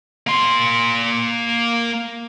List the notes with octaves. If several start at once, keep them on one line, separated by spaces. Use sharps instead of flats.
A#3 C6